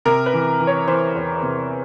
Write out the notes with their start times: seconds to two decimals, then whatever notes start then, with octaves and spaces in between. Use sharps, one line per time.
0.05 C3 A#4
0.26 B4
0.33 E3
0.60 E3
0.67 C#5
0.88 E3 C5
1.15 E2
1.43 C3